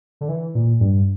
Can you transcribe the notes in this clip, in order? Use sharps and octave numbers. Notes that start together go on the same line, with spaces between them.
D3
E3
A#2
G2